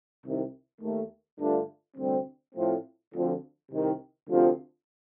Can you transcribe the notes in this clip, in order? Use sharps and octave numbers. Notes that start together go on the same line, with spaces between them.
C2 C3 D#3
D#2 D#3 A3
G2 D3 A3 D4 F4
D2 C3 G3 C4
A2 F3 A3 C4
D2 D3 F3 C4
C2 C3 D#3
D2 C3 F3 C4